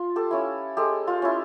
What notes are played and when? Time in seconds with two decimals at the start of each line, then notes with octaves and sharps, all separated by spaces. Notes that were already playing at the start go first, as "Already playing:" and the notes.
Already playing: F4
0.16 G4 A4
0.31 C#4 E4
0.77 G#3 G4 A4
1.07 F4
1.22 C#4 E4